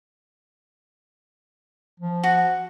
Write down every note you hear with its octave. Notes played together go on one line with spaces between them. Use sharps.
F3
F#4